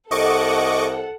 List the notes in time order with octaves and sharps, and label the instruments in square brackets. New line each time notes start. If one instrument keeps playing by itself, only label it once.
[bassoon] C2 [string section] A4 F#5 [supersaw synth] D#5 C#6 D6